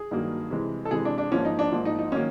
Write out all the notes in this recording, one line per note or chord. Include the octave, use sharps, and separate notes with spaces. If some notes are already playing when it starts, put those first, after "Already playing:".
Already playing: G#4
G2 D#3 F#3 A#3
C3 E3 G#3
A4
C3 E3 G#3 G#4
D4
D4
G#2 F3 A#3 C#4
D#4
D4
G#2 F3 A#3
D#4
D#4
D#3 F#3 A#3 C#4